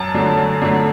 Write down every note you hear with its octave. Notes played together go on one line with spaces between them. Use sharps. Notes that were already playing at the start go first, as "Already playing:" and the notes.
Already playing: F#2 A5
D3 F#3 A3
F#2
D3 F#3 A3